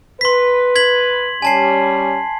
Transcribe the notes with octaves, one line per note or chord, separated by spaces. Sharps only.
B4 C6 B6
G#6 B6 F#7
G3 C#4 G#5 A5 C7